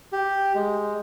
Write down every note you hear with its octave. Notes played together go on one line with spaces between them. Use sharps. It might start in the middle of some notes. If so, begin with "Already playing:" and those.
G4
G#3